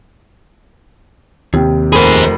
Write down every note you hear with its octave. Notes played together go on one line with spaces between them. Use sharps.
D#2 C3 G4
F1 G#4 A#4 C5 B5